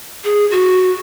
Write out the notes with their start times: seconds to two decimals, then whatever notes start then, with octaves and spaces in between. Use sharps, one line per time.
0.25 G#4
0.51 F#4